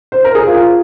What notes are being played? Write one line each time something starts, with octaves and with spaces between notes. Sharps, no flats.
C5
A#4
G#4
F4